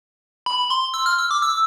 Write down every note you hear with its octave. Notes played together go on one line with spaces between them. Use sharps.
B5
C6
E6
F6
E6
D6
E6